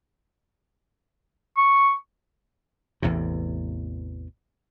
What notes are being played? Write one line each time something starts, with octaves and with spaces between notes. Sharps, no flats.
C#6
A1 E2 A2 C3